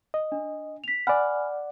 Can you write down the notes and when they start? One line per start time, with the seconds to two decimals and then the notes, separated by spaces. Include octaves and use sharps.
0.14 D#5
0.32 D4
0.84 B6 F7
1.07 D5 F#5 G#5 B5 F6